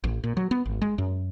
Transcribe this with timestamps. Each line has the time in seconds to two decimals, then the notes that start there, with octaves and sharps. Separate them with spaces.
0.04 A1
0.24 A#2
0.37 F#3
0.51 B3
0.66 G#1
0.82 G#3
0.98 F#2